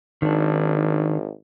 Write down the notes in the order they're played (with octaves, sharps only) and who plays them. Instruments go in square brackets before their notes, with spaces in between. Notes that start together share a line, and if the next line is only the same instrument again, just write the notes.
[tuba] G#1 [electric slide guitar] D#3 D4